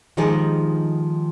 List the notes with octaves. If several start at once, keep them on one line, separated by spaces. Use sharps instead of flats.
D#3 F3 G#3 D#4 G4 G#4